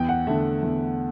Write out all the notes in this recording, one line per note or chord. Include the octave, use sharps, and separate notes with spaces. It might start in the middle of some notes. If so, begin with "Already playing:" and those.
Already playing: E2 G5
F#5
D3 A3 E5
E2